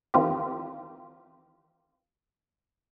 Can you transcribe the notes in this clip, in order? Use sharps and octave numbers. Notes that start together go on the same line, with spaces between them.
D#3 E3 C4 F4 G4